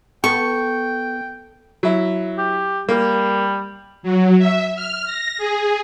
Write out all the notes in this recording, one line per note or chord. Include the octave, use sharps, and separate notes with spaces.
B3 A4 G5 C#6
F#3 E4
G4
G3 A#3
F#3
E5
F6
A#6
G#4